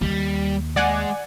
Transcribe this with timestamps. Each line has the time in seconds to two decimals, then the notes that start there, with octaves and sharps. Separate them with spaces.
0.01 D#2 G3
0.76 G#3 G#4 D5 F#5 G#5